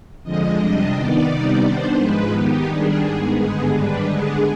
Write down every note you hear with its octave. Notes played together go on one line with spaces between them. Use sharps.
F2 D3 F3 G#3 D#5
F2 C3 G3 D4 D#5
D#3 B3 D#4 D5
C3 G3 B3 D#4
D#3 B3 D4 C5
G#2 F3 G#3 B4
D#3 B3 D#4 G4
D#3 G3 D4 G#4
G#2 D#3 B3
G2 D3 G#3 B3 G#4
G#2 D#3 G3 D4 B4
D3 G#3 B3 D4 G#4